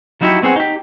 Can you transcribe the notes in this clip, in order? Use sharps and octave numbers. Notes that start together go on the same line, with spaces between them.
F3 F#3 D#4 E4 F#4 G4
B3 C4 G#4 C#5 F#5
D#4 G4